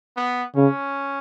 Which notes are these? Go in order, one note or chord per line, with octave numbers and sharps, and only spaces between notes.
B3
C#3 C#4